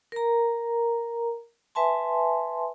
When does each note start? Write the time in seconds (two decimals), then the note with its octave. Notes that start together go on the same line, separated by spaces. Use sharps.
0.12 A#4 A#5
1.75 B4 E5 G#5 A5 C6